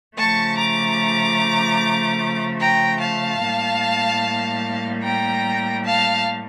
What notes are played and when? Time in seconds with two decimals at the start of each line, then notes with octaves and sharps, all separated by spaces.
0.17 C#3 F3 A3 A5 C#6
0.56 A#5 D6
2.60 G5 A#5
3.00 F5 A5
3.40 A2 G3 A#3
5.03 G5 A#5
5.84 F5 A5